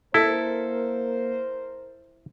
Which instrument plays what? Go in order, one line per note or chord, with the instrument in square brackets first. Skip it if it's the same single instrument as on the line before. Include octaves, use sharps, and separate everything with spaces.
[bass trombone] A#3 [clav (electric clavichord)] E4 [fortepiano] A4 [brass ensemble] A#4 C5